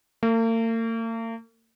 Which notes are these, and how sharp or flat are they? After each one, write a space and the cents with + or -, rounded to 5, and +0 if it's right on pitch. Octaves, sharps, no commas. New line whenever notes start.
A#3 -45